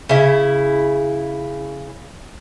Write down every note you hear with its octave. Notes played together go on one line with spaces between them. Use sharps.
C#3 E4